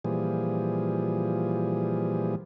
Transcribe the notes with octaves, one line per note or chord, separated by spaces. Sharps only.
A#2 E3 F3 G3 G#4